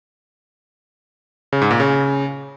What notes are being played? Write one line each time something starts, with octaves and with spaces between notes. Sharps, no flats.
C#3
G#2
A#2
C#3